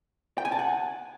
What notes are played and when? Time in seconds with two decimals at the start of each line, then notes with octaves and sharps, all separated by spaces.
0.38 G5
0.45 G#5
0.52 A5
0.59 F#5